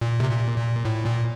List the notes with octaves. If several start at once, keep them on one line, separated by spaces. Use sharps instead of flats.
A#2
C3
A#2
A#2
A2
A#2